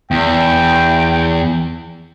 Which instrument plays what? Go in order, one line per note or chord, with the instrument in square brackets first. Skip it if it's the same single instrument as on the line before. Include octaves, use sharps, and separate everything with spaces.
[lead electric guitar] E2 [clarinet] G5